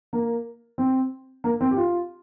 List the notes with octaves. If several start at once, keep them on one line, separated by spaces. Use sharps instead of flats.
A#3
C4
A#3
C4
G4
F4